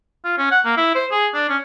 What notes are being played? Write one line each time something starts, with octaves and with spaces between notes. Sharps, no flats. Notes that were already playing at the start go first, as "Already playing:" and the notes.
F4
C#4
F#5
A#3
E4
C5
G#4
D4
C#4